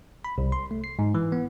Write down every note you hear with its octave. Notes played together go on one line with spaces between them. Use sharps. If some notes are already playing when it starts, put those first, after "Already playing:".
B5
C2
C6
A3
C7
G#2
E3
B3